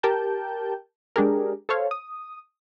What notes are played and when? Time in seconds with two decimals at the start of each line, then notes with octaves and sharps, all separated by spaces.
0.03 G4 A#4 G5 A5 G6
1.16 G#3 D4 G4 G#4 A#4
1.69 A4 C5 C#5 F5
1.91 D#6